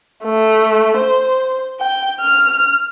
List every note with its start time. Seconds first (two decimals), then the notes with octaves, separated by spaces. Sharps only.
0.24 A3
0.97 C5
1.80 G5
2.21 F6